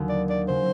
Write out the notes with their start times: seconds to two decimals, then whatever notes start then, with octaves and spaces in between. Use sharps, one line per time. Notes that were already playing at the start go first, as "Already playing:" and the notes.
Already playing: D#2 D3 F#3
0.09 D5
0.29 D5
0.48 C#3 F#3 C5